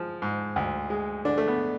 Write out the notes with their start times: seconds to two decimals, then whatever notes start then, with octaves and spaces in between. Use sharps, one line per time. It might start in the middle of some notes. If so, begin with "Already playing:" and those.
Already playing: F3 G#3
0.22 G#2
0.56 D2
0.90 G#3
1.25 D3 D4
1.38 A3
1.48 B3